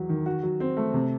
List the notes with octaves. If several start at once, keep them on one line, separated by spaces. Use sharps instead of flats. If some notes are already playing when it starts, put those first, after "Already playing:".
Already playing: E2 F#3
D#3
F#4
F#3
C4
A3
C3